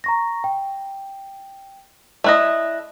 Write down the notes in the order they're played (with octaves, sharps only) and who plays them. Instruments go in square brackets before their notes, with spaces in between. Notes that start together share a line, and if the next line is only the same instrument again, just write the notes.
[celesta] A#5 C#6 A#6
G5
[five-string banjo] A3 E4 D#5 [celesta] D5 F#6 A#6